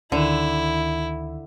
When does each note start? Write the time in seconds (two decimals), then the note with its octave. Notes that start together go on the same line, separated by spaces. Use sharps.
0.12 D2 D3 D#3 E4